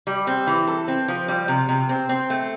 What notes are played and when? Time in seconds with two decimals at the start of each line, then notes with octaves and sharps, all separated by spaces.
0.07 G3
0.27 C4
0.47 E3
0.67 A4
0.88 C4
1.08 F3
1.28 G3
1.48 C3
1.69 C3
1.89 C4
2.09 C4
2.30 A3